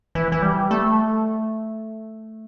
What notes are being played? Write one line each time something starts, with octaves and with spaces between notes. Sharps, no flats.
E3
E3
G3
A3